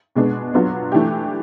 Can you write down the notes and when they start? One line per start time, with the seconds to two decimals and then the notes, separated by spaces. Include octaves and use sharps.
0.16 B2 G#3 B3 D4
0.54 F#3 B3 D4 F4
0.92 E3 A3 D4 G4